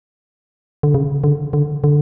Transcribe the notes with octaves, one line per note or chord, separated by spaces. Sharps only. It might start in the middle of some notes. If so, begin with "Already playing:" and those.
D3
C#3
D3
D3
D3